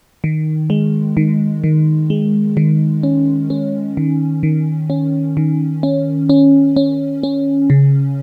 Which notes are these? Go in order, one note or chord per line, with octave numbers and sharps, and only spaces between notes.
D#3
G#3
D#3
D#3
G#3
D#3
C#4
C#4
D#3
D#3
C#4
D#3
C#4
C#4
C#4
C#4
C#3